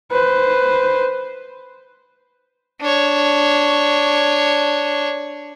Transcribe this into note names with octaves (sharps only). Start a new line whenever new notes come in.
B4 C5
D4 C#5